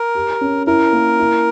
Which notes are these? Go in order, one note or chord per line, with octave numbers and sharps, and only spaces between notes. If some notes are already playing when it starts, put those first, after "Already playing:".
Already playing: A#4
G4
C#4
E4 A#4
A#3
E4